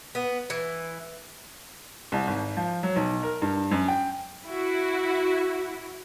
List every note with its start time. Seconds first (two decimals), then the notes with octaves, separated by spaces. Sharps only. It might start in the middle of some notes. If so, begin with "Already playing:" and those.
0.15 B3
0.50 E3
2.12 C2
2.27 G#1
2.57 F3
2.83 F#3
2.96 B1
3.23 A#4
3.42 G2
3.71 F#2
3.88 G5
4.46 E4 F#4